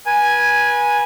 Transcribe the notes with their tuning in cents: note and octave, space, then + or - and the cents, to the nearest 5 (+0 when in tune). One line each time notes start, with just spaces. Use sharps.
B4 -30 G#5 +0